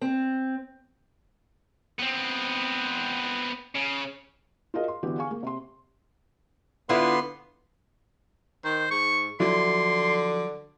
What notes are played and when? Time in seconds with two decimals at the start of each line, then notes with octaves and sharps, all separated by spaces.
0.01 C4
1.99 B3 C4
3.75 C#3
4.74 F4 F#4 G#4 A#4 D#5 F5
4.88 C6
5.03 D3 E3 B3 F#4 G4
5.18 G#4 F5 G#5 C#6
5.31 A#3 G#4
5.43 C3 C6
6.89 D3 B3 E4 F4 B4 C6
8.64 D#3 C5
8.91 G#2 C#6
9.40 D3 F3 F#3 E4 C6